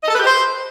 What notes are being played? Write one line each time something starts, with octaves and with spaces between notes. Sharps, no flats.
D#5
A4
B4
G4
C5